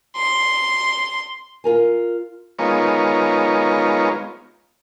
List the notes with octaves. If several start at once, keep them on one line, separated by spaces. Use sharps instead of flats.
C6
F4 A#4 G#5
G#3 B3 D#4 F4 A#4 C#5